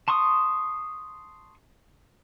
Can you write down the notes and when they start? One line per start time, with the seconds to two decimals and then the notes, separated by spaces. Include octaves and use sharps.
0.08 A5 C6 C#6 D#6